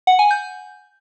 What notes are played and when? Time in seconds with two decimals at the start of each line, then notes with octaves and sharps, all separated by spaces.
0.07 F#5
0.19 G#5
0.31 G6